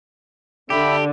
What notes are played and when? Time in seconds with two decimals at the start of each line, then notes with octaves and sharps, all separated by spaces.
0.70 D3 G4 E5 B5